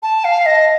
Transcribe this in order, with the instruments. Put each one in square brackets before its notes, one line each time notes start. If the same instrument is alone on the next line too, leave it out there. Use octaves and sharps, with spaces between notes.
[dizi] A5
F5
D#5